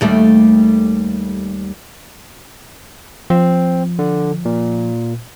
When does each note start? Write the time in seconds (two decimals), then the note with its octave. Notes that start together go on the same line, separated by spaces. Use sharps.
0.01 D#2 G3 A3
3.30 F3 C4
3.99 D3
4.45 A#2